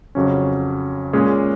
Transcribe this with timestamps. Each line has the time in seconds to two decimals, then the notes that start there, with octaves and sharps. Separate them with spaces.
0.15 F2 C#3 F#3 C#4
1.13 A#2 G#3 C#4 G#4